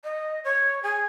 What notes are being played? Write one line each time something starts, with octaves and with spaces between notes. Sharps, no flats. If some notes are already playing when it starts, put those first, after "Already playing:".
D#5
C#5
G#4